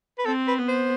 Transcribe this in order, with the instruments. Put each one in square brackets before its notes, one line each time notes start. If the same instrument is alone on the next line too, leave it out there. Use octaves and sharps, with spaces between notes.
[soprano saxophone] B4
[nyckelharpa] C4 [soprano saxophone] A4
[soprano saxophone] B4
[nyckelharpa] B3
[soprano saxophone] C5